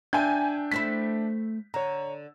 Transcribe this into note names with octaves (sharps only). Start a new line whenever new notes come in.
D4 E5 G5 G#5 G6
A3 C4 E4 B6
D3 C#5 A#5